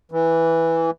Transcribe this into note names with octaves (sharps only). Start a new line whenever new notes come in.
E3